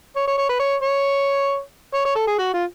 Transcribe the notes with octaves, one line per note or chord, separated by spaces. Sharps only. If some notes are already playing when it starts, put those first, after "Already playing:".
C#5
C#5
C#5
B4
C#5
C#5
C#5
C#5
A4
G#4
F#4
F4